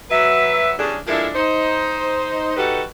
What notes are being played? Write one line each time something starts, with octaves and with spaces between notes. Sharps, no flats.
F#3 B4 E5
E2 G2 C#4 D4 G#4
F3 G#3 D4 E4 A4 A#4
D#4 C5
G3 D#4 F#4 G4 A4 B4